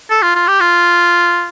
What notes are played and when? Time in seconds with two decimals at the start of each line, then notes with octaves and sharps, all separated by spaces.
0.10 A4
0.22 F4
0.35 F4
0.48 G4
0.60 F4